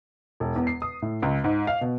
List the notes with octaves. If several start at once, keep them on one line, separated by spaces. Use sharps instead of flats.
E1
E2
C7
D#6
A2
C#2
G#2
F5
B2